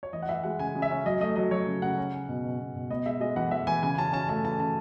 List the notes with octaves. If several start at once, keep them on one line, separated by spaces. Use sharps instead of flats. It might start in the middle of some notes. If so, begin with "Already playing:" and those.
C#5
E3 D#5
F#5
E3 E5
G#3 F#5
C#3 G#5
C#3
E5
C#4
F#3 D#5
A3 D#5
F#3 D#5
F#3 C#5
C#3
C#3 F#5
C#4
C#4
B2
B2
B2
B2
B3 D#5
G#3 E5
G#3 D#5
E3 F#5
E3 E5
E3 G#5
C#3 G#5
C#4 A5
C#4 A5
A3 A5
E3 A5
C#3 A5